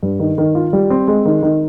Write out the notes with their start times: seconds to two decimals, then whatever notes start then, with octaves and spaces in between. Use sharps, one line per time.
0.03 G2
0.20 D#3
0.38 D#3
0.55 F4
0.73 G3
0.90 C4
1.08 G#3
1.25 D#3
1.42 D#3